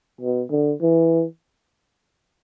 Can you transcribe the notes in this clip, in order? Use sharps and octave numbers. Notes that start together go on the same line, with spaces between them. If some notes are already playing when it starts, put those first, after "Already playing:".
B2
D3
E3